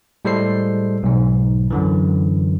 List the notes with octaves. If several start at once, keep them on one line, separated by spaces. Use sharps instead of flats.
A2 G3 G#3 A4 C5 C7
B1 G#2
F#2 D3 E3